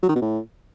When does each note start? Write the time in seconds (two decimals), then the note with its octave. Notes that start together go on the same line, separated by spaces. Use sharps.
0.03 F#3
0.09 D#3
0.15 B2
0.21 A2